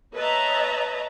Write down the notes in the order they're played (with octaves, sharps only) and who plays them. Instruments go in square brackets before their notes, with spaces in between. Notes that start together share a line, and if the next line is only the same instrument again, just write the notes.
[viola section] B4 C#5 D#5 E5 A5 A#5